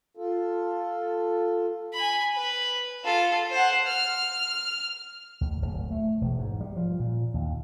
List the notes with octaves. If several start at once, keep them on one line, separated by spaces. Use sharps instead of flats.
F4 A4
G#5 B5
B4
F4 A4
C5 F#5
F6
D2
D1
A3
E1
G#2
G3
F3
A#2
D#2